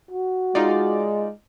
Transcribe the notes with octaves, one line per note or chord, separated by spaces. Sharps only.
F#4
G#3 D#4 F4 D5